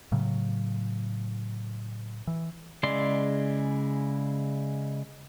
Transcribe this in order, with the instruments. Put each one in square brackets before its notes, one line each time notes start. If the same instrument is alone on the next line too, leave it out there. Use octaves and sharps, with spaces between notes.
[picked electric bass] A2 C#3 F#3
E3
[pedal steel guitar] C#3 G#3 E4 D5 C6